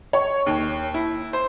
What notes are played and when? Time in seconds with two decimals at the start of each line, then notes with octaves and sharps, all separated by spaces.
0.13 C#5
0.46 D#2
0.94 E4
1.33 C5